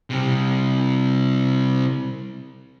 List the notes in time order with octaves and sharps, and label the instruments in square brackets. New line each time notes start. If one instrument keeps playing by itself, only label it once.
[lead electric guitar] C3 G3